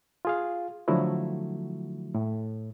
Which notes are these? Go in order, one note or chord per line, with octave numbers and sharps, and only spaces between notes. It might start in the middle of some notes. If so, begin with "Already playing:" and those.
F4 G#4 F5
D3 F3 F#3 A3 E4 F#4
A2